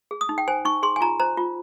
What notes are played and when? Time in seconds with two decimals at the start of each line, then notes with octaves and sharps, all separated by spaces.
0.11 G#4
0.21 D#6
0.29 D#4
0.38 G5
0.48 C5 G#5
0.65 D#4 C#6
0.83 G#4 C6
0.96 G#5
1.01 F4 A#5
1.20 C5 A#5
1.37 F4